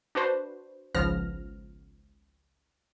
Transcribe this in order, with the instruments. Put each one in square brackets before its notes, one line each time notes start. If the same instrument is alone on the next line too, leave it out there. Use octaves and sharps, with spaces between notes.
[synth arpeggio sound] D4 F#4 B4 C5
G#1 C#2 F3 B3 F6 A#6